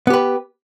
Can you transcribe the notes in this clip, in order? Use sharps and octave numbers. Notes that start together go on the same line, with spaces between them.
B3 G4 B4